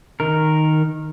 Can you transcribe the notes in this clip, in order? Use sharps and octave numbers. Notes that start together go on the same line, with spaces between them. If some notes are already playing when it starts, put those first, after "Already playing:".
D#3 A#4